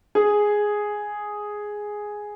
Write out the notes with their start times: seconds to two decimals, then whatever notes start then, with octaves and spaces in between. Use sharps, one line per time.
0.15 G#4